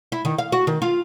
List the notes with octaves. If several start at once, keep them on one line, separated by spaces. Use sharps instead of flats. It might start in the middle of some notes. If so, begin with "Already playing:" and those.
E4
D#3
F5
F#4
D#3
F4